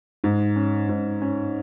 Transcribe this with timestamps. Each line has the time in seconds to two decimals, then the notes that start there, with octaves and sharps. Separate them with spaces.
0.24 G#2
0.56 C#4
0.89 G#2
1.22 C#4